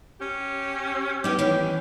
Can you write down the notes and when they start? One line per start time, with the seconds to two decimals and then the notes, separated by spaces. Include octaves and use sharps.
0.21 C#4 G4
1.24 B3 D#4 G4
1.39 D#3 E3 C#4